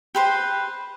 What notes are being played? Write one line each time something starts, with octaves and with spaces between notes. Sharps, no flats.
G4 B4 C5